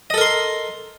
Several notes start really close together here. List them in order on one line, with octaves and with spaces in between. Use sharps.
D#5 A4 A#4 C6